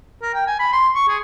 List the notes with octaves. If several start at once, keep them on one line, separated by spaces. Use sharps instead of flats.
A#4
G5
G#5
B5
C6
C#6
G#4